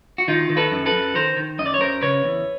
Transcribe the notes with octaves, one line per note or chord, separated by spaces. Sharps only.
F#4
D#3 D#4 F4
D#3
A4 B4
F#2
A4 B4
F#2
D#3 A#4 C5
D#3
F#2 D#5
D5
C#5
F#2 A#4 C5
C#3 B4 C#5
E2